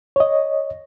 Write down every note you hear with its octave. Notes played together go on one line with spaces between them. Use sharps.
C#5 D#5